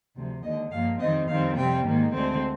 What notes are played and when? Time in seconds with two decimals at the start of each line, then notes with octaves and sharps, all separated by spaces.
0.14 D2 C3 F3
0.42 D#2 D3 G#3 D#5
0.71 G2 F3 A#3 F5
0.99 F2 D#3 G3 C4 D#5
1.27 F2 D#3 G3 C4 F5
1.55 F2 C3 G3 C4 G5
1.84 G#2 D#3 A#3
2.12 D2 D3 G#3 C4